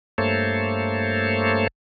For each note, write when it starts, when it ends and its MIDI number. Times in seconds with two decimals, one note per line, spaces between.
0.18 1.67 43
0.18 1.67 57
0.18 1.67 58
0.18 1.67 69
0.18 1.67 72
0.18 1.67 73